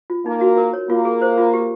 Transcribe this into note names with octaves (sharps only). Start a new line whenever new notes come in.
F4
A#3 D#4
F#4
A#4
C#5
A#3 F4
G#4
C5
F4
G4